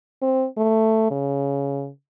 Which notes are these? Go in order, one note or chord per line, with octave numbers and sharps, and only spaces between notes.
C4
A3
C#3